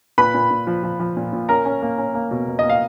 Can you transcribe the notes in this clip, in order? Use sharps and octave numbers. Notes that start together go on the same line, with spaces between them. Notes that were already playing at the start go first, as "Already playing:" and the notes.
A#2 B4 B5
A#2
A#2
F3
F3
F3
A#2
A#2
C#4 A#4 A#5
C#4
A#3
C#4
A#3
B2
B2
A#3 D#5
F5